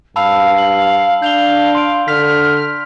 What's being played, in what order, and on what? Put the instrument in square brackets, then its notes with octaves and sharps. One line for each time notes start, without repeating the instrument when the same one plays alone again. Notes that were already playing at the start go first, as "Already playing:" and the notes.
[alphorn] G2 [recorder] F5 [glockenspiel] A5 B5 E6
[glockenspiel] F#7
[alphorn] D4 [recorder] F5 [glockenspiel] G6 F7 G7
[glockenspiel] C6 D7
[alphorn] D3 [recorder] F6 [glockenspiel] B6